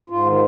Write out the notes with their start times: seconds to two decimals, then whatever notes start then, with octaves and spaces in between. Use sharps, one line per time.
0.10 G#2 F4
0.25 D#3
0.31 F4